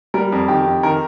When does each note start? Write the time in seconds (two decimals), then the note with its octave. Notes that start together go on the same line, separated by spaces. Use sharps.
0.14 G3 A#4
0.32 F2
0.48 D#3 G4
0.66 F2
0.83 D#3 A#4